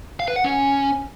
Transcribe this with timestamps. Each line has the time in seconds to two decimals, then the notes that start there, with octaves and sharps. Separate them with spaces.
0.20 F5
0.28 B4
0.36 F#5
0.44 C#4